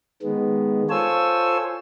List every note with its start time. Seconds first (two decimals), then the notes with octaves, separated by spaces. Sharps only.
0.22 D#3 G#3 B3
0.90 F4 A4 C5 C#5 G#5 E6